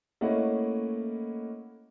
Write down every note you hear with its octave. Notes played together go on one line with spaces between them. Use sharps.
A3 A#3 C#4 E4 D#5 F#5